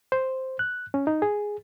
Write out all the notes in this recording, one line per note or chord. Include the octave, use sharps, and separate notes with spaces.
C5
F#6
C#4
D#4
G#4